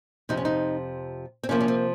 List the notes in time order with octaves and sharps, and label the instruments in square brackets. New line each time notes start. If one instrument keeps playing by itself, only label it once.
[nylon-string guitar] F2 C3 F3 D#4
C#4
D#4
C4
C3 F3 A#3 C#4
C#4
C4